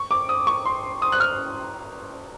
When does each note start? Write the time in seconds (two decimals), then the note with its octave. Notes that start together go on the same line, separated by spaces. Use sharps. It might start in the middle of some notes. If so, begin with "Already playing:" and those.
Already playing: C#6
0.11 D6
0.29 D#6
0.47 C#6
0.66 C6
1.02 D#6
1.12 F#6
1.20 F6